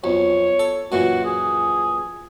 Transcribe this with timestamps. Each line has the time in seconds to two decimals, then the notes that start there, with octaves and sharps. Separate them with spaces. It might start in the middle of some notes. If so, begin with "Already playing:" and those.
0.04 B1 F2 C#5
0.59 A4
0.92 F#2 A#2 E3 F#4
1.25 G#4